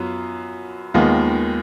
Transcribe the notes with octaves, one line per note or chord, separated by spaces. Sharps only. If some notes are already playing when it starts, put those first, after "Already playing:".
Already playing: F#2 F#3 B3 F4
D#2 D#3 G#3 B3 F4